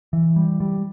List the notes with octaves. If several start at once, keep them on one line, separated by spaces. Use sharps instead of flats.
E3
G3
G3